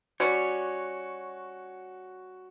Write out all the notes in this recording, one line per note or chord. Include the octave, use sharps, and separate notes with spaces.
G3 C#4 F#4 C#5